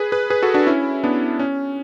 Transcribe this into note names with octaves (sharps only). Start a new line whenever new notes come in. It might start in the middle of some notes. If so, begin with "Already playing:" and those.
Already playing: G#4 B4
G#4 B4
G#4 B4
F#4 A4
D4 F#4
C#4 E4
B3 D4
C#4